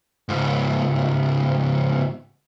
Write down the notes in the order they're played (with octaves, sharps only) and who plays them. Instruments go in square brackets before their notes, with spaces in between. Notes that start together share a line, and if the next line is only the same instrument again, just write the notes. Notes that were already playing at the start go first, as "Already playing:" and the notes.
[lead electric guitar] C#2 G#2